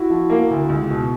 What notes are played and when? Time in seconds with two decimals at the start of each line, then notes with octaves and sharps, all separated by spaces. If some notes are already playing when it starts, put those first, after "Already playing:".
Already playing: E4 F#4
0.10 F3
0.30 A#3
0.50 D2
0.69 C#2
0.90 B2